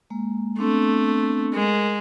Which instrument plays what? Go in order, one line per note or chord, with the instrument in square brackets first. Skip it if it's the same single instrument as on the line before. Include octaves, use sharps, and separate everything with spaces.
[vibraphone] G#3 A#3
[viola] A3 [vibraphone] B3 C4 D4
[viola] G#3 [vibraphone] A#4